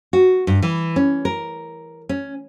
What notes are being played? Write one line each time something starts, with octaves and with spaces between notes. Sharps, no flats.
F#4
G2
E3
C#4
A#4
C#4